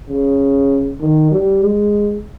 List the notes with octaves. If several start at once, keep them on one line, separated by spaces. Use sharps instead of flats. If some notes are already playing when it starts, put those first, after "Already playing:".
C#3
D#3
G3
G#3